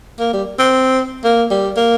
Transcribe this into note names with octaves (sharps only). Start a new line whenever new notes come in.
A#3
G3
C4
A#3
G3
A#3